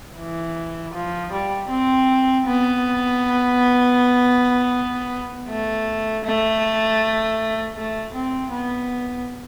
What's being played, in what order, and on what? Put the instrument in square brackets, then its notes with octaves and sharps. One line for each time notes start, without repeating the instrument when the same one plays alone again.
[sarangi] E3
F3
G3
C4
B3
A3
A3
A3
C4
B3